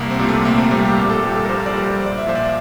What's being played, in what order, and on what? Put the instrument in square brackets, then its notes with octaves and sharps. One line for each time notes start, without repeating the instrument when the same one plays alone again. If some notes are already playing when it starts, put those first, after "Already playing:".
Already playing: [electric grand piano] C2 A#3
C4
A#2 G3
A3
C2 A#3
C4
A#2 G3 C4
G4
A#1 G4
A4
A#2 G3 G4
A4
A#4
A#1 C5
D5
A#2 G3
C5
A#1
D5
E5
A#2 F3 C5
D5